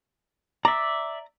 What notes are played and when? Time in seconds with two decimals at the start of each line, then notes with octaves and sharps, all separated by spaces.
0.65 D5 E5 A#5